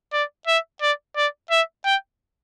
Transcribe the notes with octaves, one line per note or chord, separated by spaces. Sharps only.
D5
E5
D5
D5
E5
G5